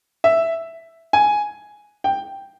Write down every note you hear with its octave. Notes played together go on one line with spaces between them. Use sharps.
E5
G#5
G5